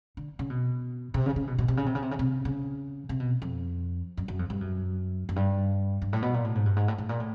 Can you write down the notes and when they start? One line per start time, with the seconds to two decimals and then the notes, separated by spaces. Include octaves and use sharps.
0.17 D3
0.39 C#3
0.50 B2
1.14 C3
1.26 C#3
1.36 C#3
1.47 B2
1.58 B2
1.68 C3
1.77 C#3
1.86 C3
1.95 C#3
2.02 C3
2.11 C#3
2.19 C3
2.45 C#3
3.09 C3
3.20 B2
3.42 F2
4.17 F#2
4.28 F#2
4.39 F2
4.50 G2
4.61 F#2
5.29 F#2
5.36 G2
6.02 G2
6.13 A2
6.22 B2
6.34 A#2
6.44 A2
6.55 G#2
6.66 G2
6.76 G#2
6.88 A2
6.98 A2
7.09 A#2
7.20 A2